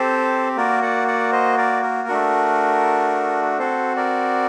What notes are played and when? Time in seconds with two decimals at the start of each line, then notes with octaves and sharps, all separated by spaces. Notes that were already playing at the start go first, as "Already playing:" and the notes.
Already playing: C4 G4 A4 C5
0.57 A#3 F#4 A#4 D5
0.82 D5 F#5
1.08 D5 F#5
1.32 C5 D#5
1.58 A#4 D5
1.83 A#4
2.08 A3 D4 F#4
3.59 C4 F#4 A4 C5
3.97 A#4 D5